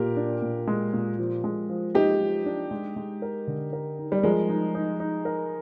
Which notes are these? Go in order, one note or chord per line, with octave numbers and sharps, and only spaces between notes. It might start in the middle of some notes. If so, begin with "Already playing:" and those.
Already playing: A#2 G4 A#4
D4
A#2
G#3
A#2
F3
G#3
F3
G#3 D#4 G4
F3
D4
G#3
G#3
A#4
D3
A#4
D#4
G3
F3 G#3 A#4
D#4
D#4
D#4
A#4